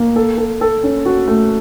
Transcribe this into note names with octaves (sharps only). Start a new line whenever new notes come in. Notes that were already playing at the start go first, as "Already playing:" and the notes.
Already playing: A#3
A4
A4
A4
C#4
F#4
A3